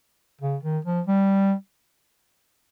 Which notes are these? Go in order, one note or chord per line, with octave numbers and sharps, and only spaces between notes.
C#3
D#3
F3
G3